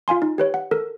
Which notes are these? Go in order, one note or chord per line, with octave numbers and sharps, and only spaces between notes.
F4 F5 G#5 C6
D#4
G4 B4 C#5
F#5
A4 A#4